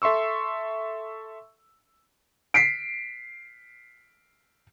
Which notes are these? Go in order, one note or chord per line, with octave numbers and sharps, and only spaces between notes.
A4 E5 C6 C#6 E6
B6 C7 D7